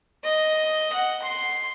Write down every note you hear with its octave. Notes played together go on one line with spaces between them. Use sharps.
D#5
F#5
C6